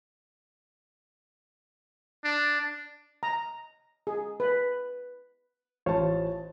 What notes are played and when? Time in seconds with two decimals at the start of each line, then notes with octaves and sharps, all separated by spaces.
2.24 D4
3.23 A#5
4.07 G#4
4.40 B4
5.86 A1 F4 C5 C#5 A5